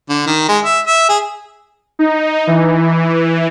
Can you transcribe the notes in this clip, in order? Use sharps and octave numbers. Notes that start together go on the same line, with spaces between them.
D3
D#3
G#3
E5
E5
G#4
D#4
E3